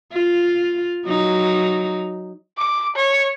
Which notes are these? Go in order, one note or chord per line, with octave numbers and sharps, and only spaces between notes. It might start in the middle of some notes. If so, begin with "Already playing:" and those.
F4
F#3 D#4
D6
C#5